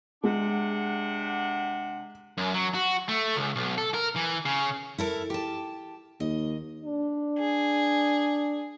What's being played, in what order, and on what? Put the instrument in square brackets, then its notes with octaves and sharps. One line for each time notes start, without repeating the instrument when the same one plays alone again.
[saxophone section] C3 D4 F#5 [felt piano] G#3
[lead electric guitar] F#2
F#3
F#4
A3
C#2
B1
A4
A#4
E3
C#3
[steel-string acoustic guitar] E4 A4 A#4
G4 A5
[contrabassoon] D#2 [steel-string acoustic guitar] D#5
[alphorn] D4
[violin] G#4